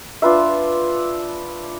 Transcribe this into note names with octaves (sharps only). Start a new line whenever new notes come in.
D4 F4 B4 E5